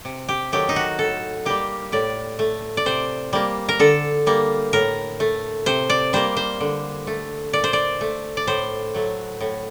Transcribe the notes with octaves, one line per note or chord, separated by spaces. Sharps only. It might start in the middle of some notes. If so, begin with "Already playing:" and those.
C3
G4
D#3 F#3 A3 G4
D#4
F#4
A2 A4
G3 A#3 G4
A2 D5
A3
D5
C3 C5
G3 A#3
A#4
D3 A4
G3 A#3
A2 A#4
A3
C3 C5
D5
G3 A#3 C5
C5
D3
A3
A#2 D5
C5
D5
A3
D5
A2 C5
F#3 A3
A2